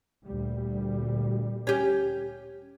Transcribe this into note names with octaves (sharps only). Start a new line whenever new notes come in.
D2 A#2 G3
C#4 G4